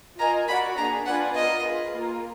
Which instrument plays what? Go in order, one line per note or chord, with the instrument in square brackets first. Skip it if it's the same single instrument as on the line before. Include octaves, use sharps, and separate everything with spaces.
[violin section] F4 A#4 D#5 G#5 [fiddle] A#5
[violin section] F#4 A#4 D5 F#5 [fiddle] B5
[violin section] A#3 D4 G#4 [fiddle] A#5
[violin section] D4 F4 B4 D5 G#5 [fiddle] F#5
[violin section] B3 F4 A#4 [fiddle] D#5
[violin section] F4 G#4 B4
A#3 F4 A#4